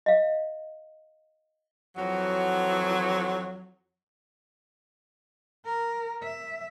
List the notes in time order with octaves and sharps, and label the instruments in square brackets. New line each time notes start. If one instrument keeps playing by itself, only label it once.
[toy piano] D#5 F5
[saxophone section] F2 E3 F#3
[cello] A#4
E5